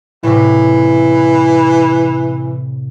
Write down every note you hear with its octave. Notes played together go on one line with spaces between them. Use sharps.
A2 C3 E3